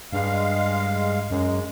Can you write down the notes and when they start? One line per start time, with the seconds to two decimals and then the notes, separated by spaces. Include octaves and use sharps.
0.13 G2 G#3 F5
1.30 F#2 G#3